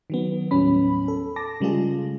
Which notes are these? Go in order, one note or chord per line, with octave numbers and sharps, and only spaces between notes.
D#3 F#3 B3
D#2 A2 F#3 G3 C#4 B5
A4
A5 D6 A#6
C#3 G3 G#3 F4 G#4